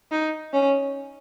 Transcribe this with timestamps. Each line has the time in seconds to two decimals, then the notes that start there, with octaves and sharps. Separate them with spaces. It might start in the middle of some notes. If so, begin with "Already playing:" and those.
0.11 D#4
0.53 C#4